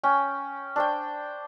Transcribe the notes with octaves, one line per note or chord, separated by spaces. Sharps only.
C#4 G5
D4 C5 G5